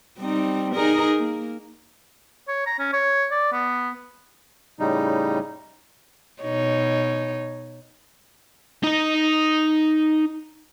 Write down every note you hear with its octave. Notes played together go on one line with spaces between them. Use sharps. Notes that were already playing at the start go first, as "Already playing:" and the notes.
G3 C4 D#4
D#4 G#4 A#4
A#3
C#5
A#5
C#4
C#5
D5
B3
A2 C#3 G3 D#4
B2 D#4 C#5
D#4 D#5